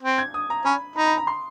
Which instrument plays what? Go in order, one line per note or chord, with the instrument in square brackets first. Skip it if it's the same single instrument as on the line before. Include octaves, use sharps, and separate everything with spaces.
[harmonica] C4
[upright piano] G#6
D#6
A#5
[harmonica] C#4 [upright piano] B5
[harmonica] D#4 [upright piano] B5
[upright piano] B5
A#5
C6